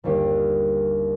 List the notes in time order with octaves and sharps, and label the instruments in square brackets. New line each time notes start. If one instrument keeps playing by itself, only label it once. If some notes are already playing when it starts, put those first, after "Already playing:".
[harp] G1 D#2 G4 C7